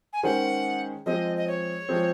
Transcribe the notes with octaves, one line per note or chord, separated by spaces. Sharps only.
G#5
D#3 G#3 C#4 G#4 C5 F#5
F3 G#3 C4 D#5
D#5
C#5
F3 G#3 C4